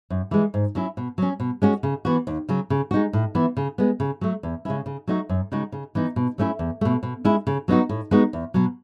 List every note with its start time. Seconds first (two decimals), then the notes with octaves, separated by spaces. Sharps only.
0.10 F#2
0.31 E3 G#3
0.54 G#2
0.75 F#3 C#4 E4
0.97 B2
1.18 F#3 C#4
1.40 B2
1.62 G#3 C#4 F#4
1.83 C#3
2.05 E3 B3 F#4
2.27 D#2
2.49 C#3 F#3
2.70 C#3
2.91 G#3 D#4 F#4
3.13 A2
3.35 E3 B3 E4
3.57 C#3
3.78 G#3 B3
4.00 C#3
4.21 F#3 A3
4.43 E2
4.65 C#3 G#3 C#4 E4
4.86 C#3
5.07 F#3 A3 D#4 F#4
5.29 F#2
5.52 C#3 G#3 D#4 F#4
5.72 C#3
5.95 E3 B3 D#4
6.16 B2
6.38 F#3 A3 C#4 E4
6.59 E2
6.81 B2 A3
7.03 B2
7.25 G#3 C#4 E4
7.47 C#3
7.68 F#3 B3 D#4 F#4
7.89 A2
8.11 G#3 B3 D#4 F#4
8.33 E2
8.54 B2 F#3